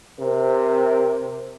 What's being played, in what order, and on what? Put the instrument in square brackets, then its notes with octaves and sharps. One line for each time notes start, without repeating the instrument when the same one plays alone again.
[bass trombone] C3 [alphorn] A#4